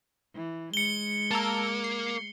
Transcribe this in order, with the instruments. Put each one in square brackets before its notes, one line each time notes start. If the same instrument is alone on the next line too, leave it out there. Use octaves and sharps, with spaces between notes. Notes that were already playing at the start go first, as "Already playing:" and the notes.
[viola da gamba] E3
[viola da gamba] G#3 [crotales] C#7 G7
[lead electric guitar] A#3 [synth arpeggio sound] A5 A#5 E6
[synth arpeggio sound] C7